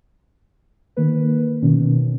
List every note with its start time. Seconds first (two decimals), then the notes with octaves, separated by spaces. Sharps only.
0.97 D#3 A#3 B4
1.62 B2 D#3 C#4